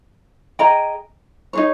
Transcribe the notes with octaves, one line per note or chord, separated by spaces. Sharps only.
G#4 D#5 G5 A#5
D#4 G#4 C#5